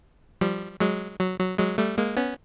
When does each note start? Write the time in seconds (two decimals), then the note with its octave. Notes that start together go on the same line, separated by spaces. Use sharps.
0.41 F3 G3
0.80 F#3 G#3
1.20 F#3
1.39 F#3
1.58 F#3 G#3
1.78 G3 A3
1.98 G#3 A#3
2.17 B3 C#4